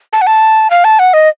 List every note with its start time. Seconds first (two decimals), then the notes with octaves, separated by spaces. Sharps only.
0.13 A5
0.21 F#5
0.27 A5
0.70 F5
0.84 A5
0.99 F#5
1.14 D#5